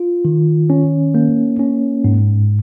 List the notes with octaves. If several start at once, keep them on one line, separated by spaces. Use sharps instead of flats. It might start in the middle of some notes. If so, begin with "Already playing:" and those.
Already playing: F4
D#3
C#4
A#3
C#4
G#2